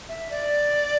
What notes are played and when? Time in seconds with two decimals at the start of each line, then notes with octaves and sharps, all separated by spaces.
0.09 E5
0.30 D5